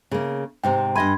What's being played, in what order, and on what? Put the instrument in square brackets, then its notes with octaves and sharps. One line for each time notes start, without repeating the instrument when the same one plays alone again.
[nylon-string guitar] C#3 A#3
[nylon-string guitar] G#2 C3 C4 [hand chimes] G5
[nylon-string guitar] G2 D#5 G#5 [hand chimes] B5 C6 G#6